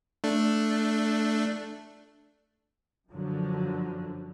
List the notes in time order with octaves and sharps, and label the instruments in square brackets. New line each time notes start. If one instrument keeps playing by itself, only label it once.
[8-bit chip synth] A3 D4
[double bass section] F#2 D3 F3 F#3